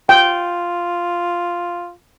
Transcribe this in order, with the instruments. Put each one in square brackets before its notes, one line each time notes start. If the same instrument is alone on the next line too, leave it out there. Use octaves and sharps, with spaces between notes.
[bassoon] F4 [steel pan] G5